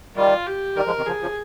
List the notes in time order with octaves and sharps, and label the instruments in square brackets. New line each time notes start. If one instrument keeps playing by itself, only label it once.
[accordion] D#3 G3 [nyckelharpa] F4
[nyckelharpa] G4
[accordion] D#3 G3 [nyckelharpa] A#4
[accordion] F3 G#3
C3 D#3
[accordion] C#3 F3 [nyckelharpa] G#4
[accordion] C#3 F3